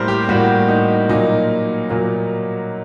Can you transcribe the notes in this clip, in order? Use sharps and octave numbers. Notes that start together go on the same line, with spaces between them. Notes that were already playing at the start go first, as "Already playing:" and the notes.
Already playing: A2 G3 A#3 A#4 C5
G4
A2 G3 A#3 F#4
D#4
A#2 F#3 A#3 D#4
A#2 F#3 A#3